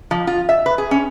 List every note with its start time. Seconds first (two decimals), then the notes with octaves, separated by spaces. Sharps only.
0.11 F3
0.27 F4
0.49 E5
0.66 B4
0.78 G#4
0.91 C#4